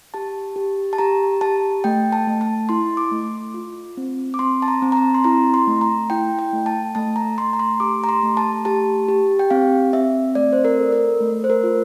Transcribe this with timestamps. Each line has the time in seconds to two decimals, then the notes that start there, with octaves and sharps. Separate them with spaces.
0.14 G4 A5
0.56 G4
0.93 A5
0.98 G4 A#5
1.41 G4 A5
1.84 A3 G5
2.12 A5
2.27 A3
2.41 A5
2.69 E4 C6
2.97 D6
3.12 A3
3.54 F4
3.97 C4
4.34 D6
4.39 C4 C6
4.62 A5
4.68 A#5
4.82 C4
4.92 A#5
4.97 A5
5.15 C6
5.24 E4 A#5
5.54 C6
5.67 A3
5.81 A#5
6.10 E4 G5
6.39 G5
6.53 A3
6.66 A5
6.95 A3 A5
7.16 A#5
7.38 A3 C6
7.53 A#5
7.60 C6
7.80 G4 D6
8.04 A#5
8.09 C6
8.23 A3
8.37 A5
8.65 G4 A5
9.09 G4
9.39 G5
9.50 C4 F5
9.93 C4 E5
10.35 A3 D5
10.52 C5
10.65 A#4
10.78 A4
10.92 A#4
11.21 A3
11.44 C5
11.50 A#4
11.64 F4